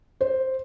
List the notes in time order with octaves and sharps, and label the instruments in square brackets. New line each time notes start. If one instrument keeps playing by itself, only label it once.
[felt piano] C5